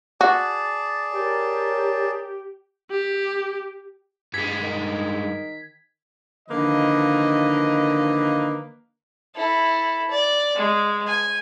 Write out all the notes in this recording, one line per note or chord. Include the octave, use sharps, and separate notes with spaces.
F#4 G#4 D5 A5
G4 A#4 C#5
G4
G2 G#3 G#6 B6
D#3
D3 D#3 F3 A#3 B4 D#5
E4 A4
D5
G#3
G#5